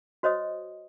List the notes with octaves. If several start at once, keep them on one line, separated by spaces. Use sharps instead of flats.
F#4 C5 C#5 D#5 D#6